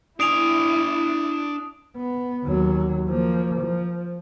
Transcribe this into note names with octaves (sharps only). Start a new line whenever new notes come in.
D4 E4 G#5 D#6 D7 F7
B3
D#2 F#3
F3 A#3
F3